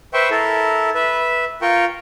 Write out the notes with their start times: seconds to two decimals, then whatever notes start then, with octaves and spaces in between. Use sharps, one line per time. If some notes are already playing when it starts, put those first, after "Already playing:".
0.14 B4 C5 E5 G5 C#6
0.31 E4 A4 A#4
0.95 B4 E5
1.62 F4 A#4 G5 C#6